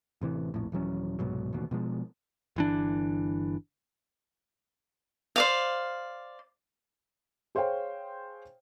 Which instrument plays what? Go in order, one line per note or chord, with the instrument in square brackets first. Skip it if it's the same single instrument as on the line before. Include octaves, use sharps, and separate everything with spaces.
[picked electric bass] A1 C3 E3
A#1 F2 A2
D#1 E3 F#3 C#4
C2 G#2 B2 F#3
E1 A1 D#2 B2
B2 F3 G#3
G1 E3 D4
[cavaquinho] C5 D5 F5
[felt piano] G#4 C5 C#5 F5 G5